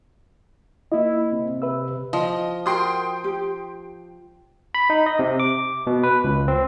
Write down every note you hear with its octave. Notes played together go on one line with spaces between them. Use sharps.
A#3 E4 D#5
C3
B4 E5 E6
F3 D#5
F#4 A#4 G5 C6 D#6
G4
B5
D#4
D#5
C3
D6
B2
B4
C#2
C4